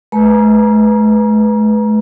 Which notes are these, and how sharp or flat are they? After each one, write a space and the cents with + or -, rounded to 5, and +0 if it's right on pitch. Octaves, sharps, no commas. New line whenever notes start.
A3 -45 B4 -5 A#5 +25